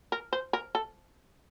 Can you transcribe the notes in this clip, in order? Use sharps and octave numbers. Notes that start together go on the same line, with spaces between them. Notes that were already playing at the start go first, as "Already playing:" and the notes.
A#4
C5
A#4
A4